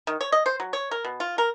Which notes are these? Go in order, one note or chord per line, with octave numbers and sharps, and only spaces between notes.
D#3
C#5
D#5
C5
F#3
C#5
A#4
B2
F4
A#4